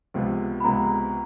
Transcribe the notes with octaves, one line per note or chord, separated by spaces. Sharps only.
C#2 C3 F3 G#3 B3
B5
C#2 C3 F3 G#3 B3 A#5